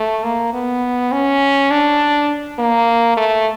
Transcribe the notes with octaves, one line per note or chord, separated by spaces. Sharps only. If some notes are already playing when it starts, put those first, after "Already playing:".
Already playing: A3
A#3
B3
C#4
D4
A#3
A3